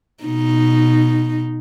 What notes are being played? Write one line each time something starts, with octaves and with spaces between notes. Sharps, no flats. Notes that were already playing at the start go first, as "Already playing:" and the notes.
B2 D#4